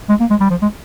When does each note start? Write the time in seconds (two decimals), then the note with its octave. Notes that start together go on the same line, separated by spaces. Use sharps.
0.09 G#3
0.20 A#3
0.30 G#3
0.41 G3
0.50 F3
0.62 G#3